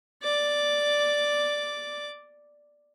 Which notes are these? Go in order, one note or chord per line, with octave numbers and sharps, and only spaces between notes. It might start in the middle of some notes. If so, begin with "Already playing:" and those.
D5 D6